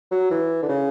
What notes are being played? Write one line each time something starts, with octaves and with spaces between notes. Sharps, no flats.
F#3
E3
D3
C#3